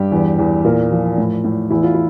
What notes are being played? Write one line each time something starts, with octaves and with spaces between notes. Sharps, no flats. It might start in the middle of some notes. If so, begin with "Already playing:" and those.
Already playing: G2 G4
E2
E2
A#2 A#4
F3
A2
A2
E2 E4
F4
E4